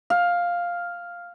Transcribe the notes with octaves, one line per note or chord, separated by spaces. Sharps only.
F5